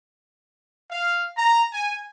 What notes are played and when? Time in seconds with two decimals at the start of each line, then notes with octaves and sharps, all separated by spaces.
0.89 F5
1.37 A#5
1.72 G#5